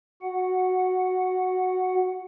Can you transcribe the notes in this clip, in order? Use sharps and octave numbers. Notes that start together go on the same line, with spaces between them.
F#4 F#5